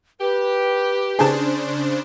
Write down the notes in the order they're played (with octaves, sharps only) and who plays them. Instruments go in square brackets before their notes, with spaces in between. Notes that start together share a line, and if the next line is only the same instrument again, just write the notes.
[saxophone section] G4 [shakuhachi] B4
[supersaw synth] C#3 D4 C5 [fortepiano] G#4 A5